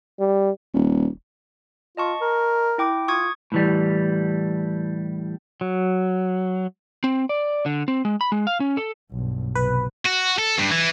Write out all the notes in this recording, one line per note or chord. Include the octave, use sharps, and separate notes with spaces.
G3
D#1
F4 D#5 A5 C#6
A#4
E4 G5 D6
F4 C#6 D#6 G#6
A2 E3 G3
F#3
C4
D5
D3
C4
G#3
B5
G#3
F5
C#4
A4
B1 G2
B1 C3 B4
F#4
A4
G2
E3